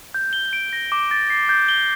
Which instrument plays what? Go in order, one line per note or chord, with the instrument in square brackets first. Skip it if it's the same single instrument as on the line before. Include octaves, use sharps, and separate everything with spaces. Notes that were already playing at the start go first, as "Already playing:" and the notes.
[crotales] G6
G7
D7
A#6
D6
A6
C7
G6
G7